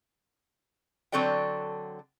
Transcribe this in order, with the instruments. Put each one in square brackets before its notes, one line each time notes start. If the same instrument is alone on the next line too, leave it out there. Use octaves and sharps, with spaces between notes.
[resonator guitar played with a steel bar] D3 F#3 C4 A4 D5 G5